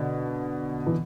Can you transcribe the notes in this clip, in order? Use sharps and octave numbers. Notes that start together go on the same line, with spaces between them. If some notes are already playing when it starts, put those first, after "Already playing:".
Already playing: B2 D3
E3